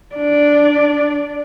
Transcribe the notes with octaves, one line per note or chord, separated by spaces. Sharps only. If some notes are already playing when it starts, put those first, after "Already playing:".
D4 D5